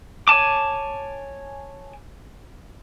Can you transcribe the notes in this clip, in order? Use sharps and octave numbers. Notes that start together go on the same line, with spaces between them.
C#5 G#5 A5 D6